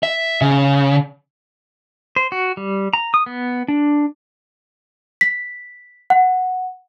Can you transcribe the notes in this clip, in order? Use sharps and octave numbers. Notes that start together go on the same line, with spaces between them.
E5
C#3
C5
F#4
G3
A#5
D#6
B3
D4
B6
F#5